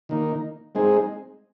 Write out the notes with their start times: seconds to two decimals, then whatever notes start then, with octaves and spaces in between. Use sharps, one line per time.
0.09 D#3 A#3 D#4
0.75 G#3 C4 D#4 G#4